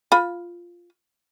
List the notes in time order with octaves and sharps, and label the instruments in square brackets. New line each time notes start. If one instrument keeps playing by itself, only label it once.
[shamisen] F4 B5